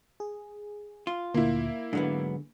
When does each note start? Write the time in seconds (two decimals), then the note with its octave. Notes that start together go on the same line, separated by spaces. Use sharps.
0.20 G#4
1.07 F4
1.34 D2 A#2 A#3 E4
1.93 G#2 D3 F#3 B3